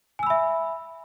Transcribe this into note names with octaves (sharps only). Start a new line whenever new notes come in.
E5 G#5 B5 E6